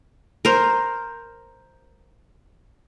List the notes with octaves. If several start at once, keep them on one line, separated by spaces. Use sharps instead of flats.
A#4 C5